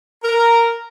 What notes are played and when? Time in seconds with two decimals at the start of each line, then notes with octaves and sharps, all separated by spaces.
0.24 A#4